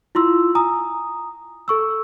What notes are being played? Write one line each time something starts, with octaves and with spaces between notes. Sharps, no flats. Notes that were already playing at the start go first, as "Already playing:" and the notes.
E4 F4 C6 E6
G#5 A#5 D#6
A4 C#6 E6